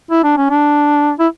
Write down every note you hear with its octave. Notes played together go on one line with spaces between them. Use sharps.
E4
D4
C#4
D4
E4